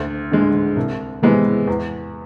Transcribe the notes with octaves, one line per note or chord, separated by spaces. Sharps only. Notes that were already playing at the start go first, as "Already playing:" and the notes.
Already playing: D2
D3 G#3
C2
C3 E3 G#3 B3
E2